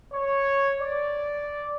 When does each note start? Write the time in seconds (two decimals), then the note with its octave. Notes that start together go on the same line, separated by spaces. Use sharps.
0.13 C#5
0.81 D5